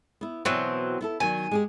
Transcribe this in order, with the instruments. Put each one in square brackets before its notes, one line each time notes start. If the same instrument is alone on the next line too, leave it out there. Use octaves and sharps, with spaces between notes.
[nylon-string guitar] B3 E4
[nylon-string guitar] B2 B3 [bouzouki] E3 F#3 C4
[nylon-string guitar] B3 E4 A4
[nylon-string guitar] D#3 F#3 [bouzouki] G#5
[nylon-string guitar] G#3 G4 G#4